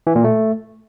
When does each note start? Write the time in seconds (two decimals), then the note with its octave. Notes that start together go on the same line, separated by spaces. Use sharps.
0.07 E3
0.15 A#2
0.24 A3